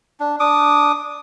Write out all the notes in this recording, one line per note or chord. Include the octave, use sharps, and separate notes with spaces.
D4
D4 D6 D#6